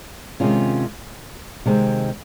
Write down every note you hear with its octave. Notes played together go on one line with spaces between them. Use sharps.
C3 D#3 G#3 C#4 F4
C3 D#3 G#3 C4